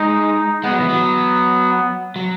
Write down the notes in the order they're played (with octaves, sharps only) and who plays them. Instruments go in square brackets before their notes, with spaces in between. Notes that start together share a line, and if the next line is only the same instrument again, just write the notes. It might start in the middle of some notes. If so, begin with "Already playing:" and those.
Already playing: [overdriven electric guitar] G#3 [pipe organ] D#4
[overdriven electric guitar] G#3 [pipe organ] B3
[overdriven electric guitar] F#3
E3
F#3
F#3